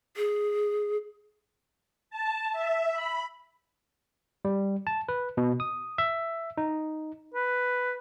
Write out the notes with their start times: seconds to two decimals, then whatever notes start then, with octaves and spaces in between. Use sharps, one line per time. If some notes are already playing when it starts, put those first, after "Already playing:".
0.17 G#4
2.10 A5
2.53 E5
2.93 B5
4.45 G3
4.87 A5
5.09 B4
5.37 B2
5.60 D#6
5.98 E5
6.58 D#4
7.34 B4